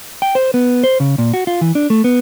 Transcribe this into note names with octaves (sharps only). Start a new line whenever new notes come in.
G5
C5
B3
C5
C#3
A#2
F#4
F4
E3
D4
A3
B3